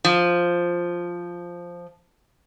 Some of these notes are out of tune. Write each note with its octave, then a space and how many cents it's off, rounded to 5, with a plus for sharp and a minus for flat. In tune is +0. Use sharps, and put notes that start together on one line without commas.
F3 +0